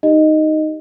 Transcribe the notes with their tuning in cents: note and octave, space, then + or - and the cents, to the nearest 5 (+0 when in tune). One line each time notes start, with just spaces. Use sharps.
D#4 +0 G4 +0 D#5 -5